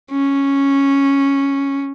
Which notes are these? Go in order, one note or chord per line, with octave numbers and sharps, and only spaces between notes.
C#4